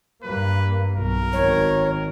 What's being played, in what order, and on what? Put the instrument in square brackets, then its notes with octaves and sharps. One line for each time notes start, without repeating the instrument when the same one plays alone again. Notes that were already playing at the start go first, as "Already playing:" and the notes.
[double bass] G2 A#3 [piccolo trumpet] B4
[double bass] B1 [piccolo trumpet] A#4
[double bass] G#1 D#3 [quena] C#5